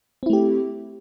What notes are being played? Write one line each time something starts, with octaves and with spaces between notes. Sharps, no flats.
A3 C4 E4 G4